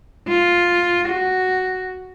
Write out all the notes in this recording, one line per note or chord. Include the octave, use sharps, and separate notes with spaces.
F4
F#4